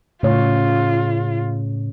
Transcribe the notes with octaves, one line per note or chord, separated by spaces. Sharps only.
A2 C#3 F4 C#5